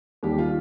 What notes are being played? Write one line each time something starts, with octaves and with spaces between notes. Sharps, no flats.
D#2 D#3 G3 G4
F4